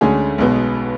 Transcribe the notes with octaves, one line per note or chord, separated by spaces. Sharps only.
D2 D3 G#3 C#4 G#4
B1 B2 G#3 B3